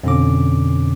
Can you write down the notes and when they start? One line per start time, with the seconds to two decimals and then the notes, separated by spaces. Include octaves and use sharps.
0.03 F2 B2 D3 C#4 D6